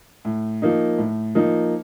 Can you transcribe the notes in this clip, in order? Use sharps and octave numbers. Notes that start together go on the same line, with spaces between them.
A2
F3 A#3 D#4
A2
F3 A#3 D#4